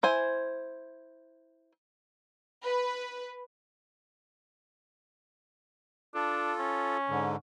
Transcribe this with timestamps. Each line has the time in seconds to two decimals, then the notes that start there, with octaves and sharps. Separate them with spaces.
0.03 E4 C5 G#5
2.64 B4
6.15 D4 F4 A4
6.59 C#4
7.09 G#2 D3